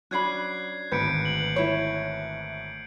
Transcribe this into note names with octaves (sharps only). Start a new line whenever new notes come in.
F#3 C#4 D4 B5 F#6 G#6 C7
G#1 D2 B4 G6 C#7 D7
F#7
E4 B4 C#5